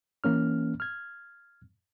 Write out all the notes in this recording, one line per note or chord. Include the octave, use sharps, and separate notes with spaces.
E3 A#3 C#4 F6
F6 G#6